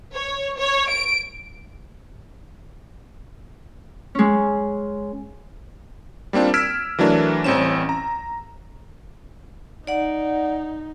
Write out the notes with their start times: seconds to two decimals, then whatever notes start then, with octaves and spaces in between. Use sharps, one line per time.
0.13 C#5
0.58 C#5
0.90 D7
4.15 G#3 C#4
6.33 G3 A#3 C4 D4 F4
6.54 E6 F6 G#6 B6 D7 E7
6.98 E3 F#3 A3 D4 A#4 E5
7.44 A1 G3 C4 C#4 E7
7.89 A#5
9.87 D#4 D5 F#5